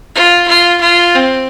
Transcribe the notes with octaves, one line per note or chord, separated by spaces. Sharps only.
F4
F4
F4
C4